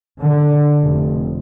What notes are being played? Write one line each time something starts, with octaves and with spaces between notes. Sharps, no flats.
D3
F1